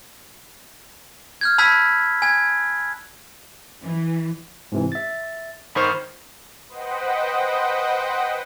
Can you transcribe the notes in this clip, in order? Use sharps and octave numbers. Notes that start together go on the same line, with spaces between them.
F6 G6 G#6
A5 B5 E6 F#6 G#6 B6
G#5 G#6
E3
G#2 C3 E3
E5 A6
G1 D#3 C5 B5 C#6 F6
B4 C5 D#5 F#5 G5